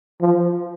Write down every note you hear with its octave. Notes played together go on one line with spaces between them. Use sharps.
F3